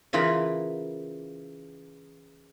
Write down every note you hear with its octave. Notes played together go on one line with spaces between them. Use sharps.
C#3 E3 F4 A#4 B4 B5